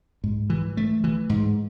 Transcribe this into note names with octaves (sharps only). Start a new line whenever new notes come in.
G#2
E3
A3
E3
G#2